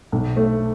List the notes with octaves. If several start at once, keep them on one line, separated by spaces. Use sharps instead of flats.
B1
A3